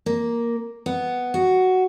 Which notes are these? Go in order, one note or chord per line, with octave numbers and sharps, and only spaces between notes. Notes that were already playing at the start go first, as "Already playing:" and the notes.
A#3
B3
F#4